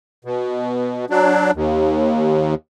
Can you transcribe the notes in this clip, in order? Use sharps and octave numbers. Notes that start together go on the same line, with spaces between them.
B2
F#3 D4
D#2